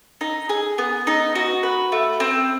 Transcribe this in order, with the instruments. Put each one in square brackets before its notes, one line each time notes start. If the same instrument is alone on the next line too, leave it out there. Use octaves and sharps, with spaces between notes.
[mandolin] D#4
G#4
B3
D#4
F#4
B4
A3
C4